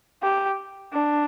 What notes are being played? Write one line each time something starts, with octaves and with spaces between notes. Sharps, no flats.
G4
D4